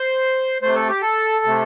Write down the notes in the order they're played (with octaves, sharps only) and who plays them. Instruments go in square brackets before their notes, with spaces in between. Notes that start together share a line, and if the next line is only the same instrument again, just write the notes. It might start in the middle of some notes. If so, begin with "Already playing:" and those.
Already playing: [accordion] C5
C3 A3 C5
A4
G4
A4
C3 A3